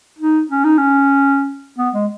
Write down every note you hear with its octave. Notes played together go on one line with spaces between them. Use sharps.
D#4
C#4
D#4
C#4
B3
G#3